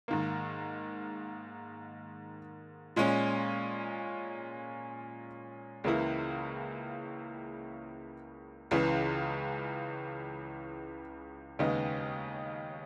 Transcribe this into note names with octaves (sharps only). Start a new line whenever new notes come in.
G#2 D#3 A#3
A#2 G#3 C#4
C#2 C#3 E3 A#3 E4
C#2 C#3 E3
D#2 C#3 G#3 B3 D#4